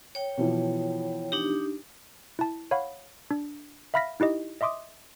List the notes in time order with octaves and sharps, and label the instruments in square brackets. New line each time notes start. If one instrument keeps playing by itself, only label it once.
[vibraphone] C#5 G5
[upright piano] B2 E3 F3
[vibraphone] D4 D#4 G4
[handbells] E4 A5
C#5 F5 F#5 B5
D4
E5 F5 B5 F6 A#6 B6
D#4 E4 G4 D#5
D#5 E5 C6 D6 D#6